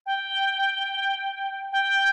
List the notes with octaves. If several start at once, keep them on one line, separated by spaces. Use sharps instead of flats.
G5
G5